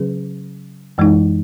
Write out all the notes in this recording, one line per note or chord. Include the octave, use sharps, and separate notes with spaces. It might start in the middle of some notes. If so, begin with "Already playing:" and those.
Already playing: C#3 F#3 C#4 G#4 B4
F#2 E3 G#3 D#4